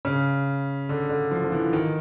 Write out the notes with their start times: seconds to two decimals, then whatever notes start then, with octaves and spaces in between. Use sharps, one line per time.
0.05 C#3
0.89 D3
1.09 D3
1.31 F3
1.44 F3
1.52 E3
1.73 D#3